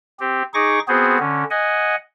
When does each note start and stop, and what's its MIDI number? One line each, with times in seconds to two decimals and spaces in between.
0.20 0.42 60
0.20 0.42 67
0.54 0.79 63
0.54 0.79 68
0.54 0.79 85
0.54 0.79 86
0.54 0.79 94
0.88 1.18 59
0.88 1.18 60
0.88 1.18 66
0.88 1.18 68
0.88 1.18 72
1.20 1.44 50
1.20 1.44 61
1.50 1.95 75
1.50 1.95 78
1.50 1.95 80